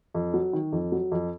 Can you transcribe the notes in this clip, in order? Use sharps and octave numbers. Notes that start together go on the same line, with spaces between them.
F2
F#3
D#3
F2
F#3
F2